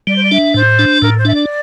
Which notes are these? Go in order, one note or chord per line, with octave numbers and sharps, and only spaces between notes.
G3 D5
C5
D5
D4 E5
A2 C5
D4
A2 A#4
C5
D4 E5
D5